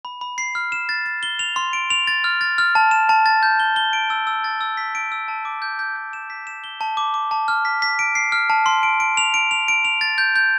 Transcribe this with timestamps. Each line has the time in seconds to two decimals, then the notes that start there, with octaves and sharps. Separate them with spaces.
0.05 B5
0.21 B5
0.38 C7
0.55 F6
0.72 E7
0.89 A6
1.06 A6
1.23 G7
1.39 F7
1.56 C6
1.73 D7
1.90 F7
2.07 A6
2.24 F6
2.41 A6
2.58 F6
2.75 A5
2.91 E7
3.09 A5
3.26 A6
3.43 G6
3.60 G7
3.76 G7
3.93 D7
4.10 E6
4.27 E6
4.44 A6
4.61 E6
4.77 B6
4.95 D7
5.12 E6
5.28 A5
5.45 D6
5.62 G6
5.79 G6
5.96 G6
6.13 E7
6.30 B6
6.47 E7
6.64 G7
6.81 A5
6.97 D6
7.14 D6
7.31 A5
7.48 F6
7.65 B6
7.82 B6
7.99 D7
8.15 C7
8.32 F6
8.50 A5
8.66 C6
8.83 D7
9.00 D7
9.17 F7
9.34 D7
9.51 F7
9.68 D7
9.85 F7
10.01 A6
10.18 G6
10.36 G6